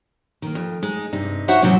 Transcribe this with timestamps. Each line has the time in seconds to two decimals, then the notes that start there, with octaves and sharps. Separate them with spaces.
0.42 D#3 A#3
0.55 F2
0.82 G#3 D#4
1.13 G2 C3 D#4
1.48 D#4 F#4 C5 C#5 E5 F#5
1.62 G#2 C3 E3 F#3 C4 C#4